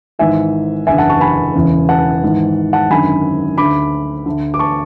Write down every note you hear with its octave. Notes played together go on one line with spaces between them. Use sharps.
G#1 G#2 E3 E5 G#5
F#1 E2 D3 E5 G#5
F#5 A5
A5 C#6
G#5 B5
E1 E2 C#3 E3
F#5 A5
G#1 G#2 E3
F#5 A5
G#1 F#2 D3 G#5 B5
D2 D3 B5 D6
D2 D3
D6
A5 C#6